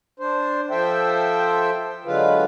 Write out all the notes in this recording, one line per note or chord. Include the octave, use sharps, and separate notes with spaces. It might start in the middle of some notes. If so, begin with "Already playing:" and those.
D4 C5
F3 A4 C5 E5 G5
D3 F#3 G#3 F4 B4